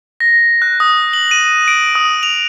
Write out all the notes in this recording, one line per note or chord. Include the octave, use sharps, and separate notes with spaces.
A#6
F#6
D#6
F#7
D#7
D7
D#6
F7